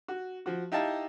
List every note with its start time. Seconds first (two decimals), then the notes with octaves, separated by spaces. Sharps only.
0.08 F#4
0.46 F3 F#4
0.72 D#4 E4 G4 D#5 F5 A5